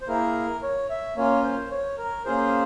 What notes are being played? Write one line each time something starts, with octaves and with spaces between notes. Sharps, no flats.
C5
A#3 E4 G#4 A#4
C#5
E5
A#3 C#4 F4 C#5
C5
C#5
A#4
A#3 C#4 F4 G#4 C5